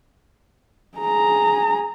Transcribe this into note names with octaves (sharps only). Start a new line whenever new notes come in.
G#4 A#5